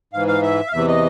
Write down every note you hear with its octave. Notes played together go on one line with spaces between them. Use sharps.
G#2 E3 F5
F5
E5
F5
E2 C3 E3 E5
D#5